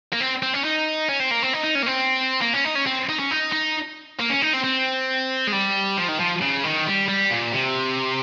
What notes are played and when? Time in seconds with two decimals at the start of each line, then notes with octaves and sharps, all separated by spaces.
0.13 A#3
0.20 C4
0.43 C4
0.54 C#4
0.65 D#4
1.09 C#4
1.20 C4
1.31 A#3
1.43 C4
1.53 D#4
1.64 D#4
1.75 C#4
1.82 A#3
1.86 C4
2.41 A#3
2.53 C#4
2.65 D#4
2.75 C#4
2.86 C4
3.09 D#4
3.19 C#4
3.31 D#4
3.52 D#4
4.20 A#3
4.30 C#4
4.42 D#4
4.53 C4
4.64 C4
5.47 G#3
5.52 G3
5.97 F3
6.08 D#3
6.19 F3
6.41 C#3
6.64 D#3
6.86 G3
7.08 G3
7.31 A#2
7.52 C3